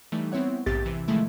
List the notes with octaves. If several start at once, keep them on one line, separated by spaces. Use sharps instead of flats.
E3 G3 A3 D#4
B3 C4 E4 C#5 F#5
A#1 D#2 G#2 C3 G4 A6
C3 E3 E4
C3 D#3 F3 G#3 A3 E4